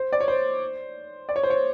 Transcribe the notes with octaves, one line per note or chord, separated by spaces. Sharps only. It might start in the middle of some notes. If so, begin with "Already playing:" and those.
Already playing: C5
D5
C#5
C5
D5
C#5
C5
C#5